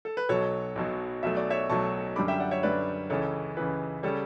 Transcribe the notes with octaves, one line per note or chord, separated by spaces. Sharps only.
A4
B4
B1 B2 F#3 A4 C#5
B1 B2 F#3
B1 B2 F#3 A3 E5
D5
C#5 E5
B1 B2 F#3 A3 A5 C#6
F#2 D3 G3 B5 D6
E5 G5
D5 F#5
C#5 E5
F#2 D3 G3 B4 D5
C#2 C#3 E3 A4 C#5
C#2 C#3 E3 B4
C#3 G3 A4 C#5